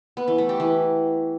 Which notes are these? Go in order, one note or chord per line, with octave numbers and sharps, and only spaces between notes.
B3
E3
A3
G4
E3